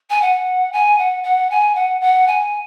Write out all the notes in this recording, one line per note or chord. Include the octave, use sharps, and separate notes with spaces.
G#5
F#5
G#5
F#5
F#5
G#5
F#5
F#5
G#5